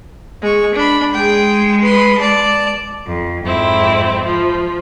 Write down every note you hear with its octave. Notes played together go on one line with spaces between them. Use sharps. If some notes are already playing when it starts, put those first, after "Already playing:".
G#3 C#6
D4 B5
G#3 G#4 G5
B4 C6
D5 A5
F2
F2 G#2 C4 E4
F3